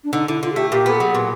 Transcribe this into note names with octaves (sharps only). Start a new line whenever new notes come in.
D4
D3 D#4
D3 E4
D3 F4
G#4
A3 G4
A#2 G4
B3 A4
F#3 G#4
A#2